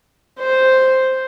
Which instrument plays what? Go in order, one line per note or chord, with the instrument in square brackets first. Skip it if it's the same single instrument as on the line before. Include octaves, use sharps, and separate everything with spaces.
[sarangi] C5